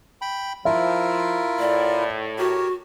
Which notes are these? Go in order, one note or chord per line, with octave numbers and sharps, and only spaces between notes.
G5 B5
F3 E4 F4 A#4 E5
A2 D5
F#4 G4 A#4 C#5